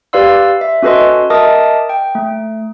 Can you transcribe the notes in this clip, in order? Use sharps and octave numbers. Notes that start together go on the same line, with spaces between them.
G4 B4 D5 F5 C6 E6
E5
C#4 F#4 A4 B4 D#5 C6
A#4 D#5 E5 A5 D6 D#6
G5
A3